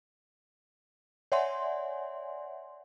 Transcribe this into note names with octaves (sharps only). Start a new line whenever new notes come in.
C#5 D5 E5 F#5 G#5 C6